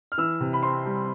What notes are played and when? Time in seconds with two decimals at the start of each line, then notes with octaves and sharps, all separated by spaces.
0.12 F6
0.18 E3 E6
0.40 C3
0.53 B5
0.63 C4 C6
0.86 G3